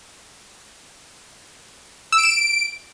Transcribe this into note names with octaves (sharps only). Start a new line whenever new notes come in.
E6
D7
E7
D7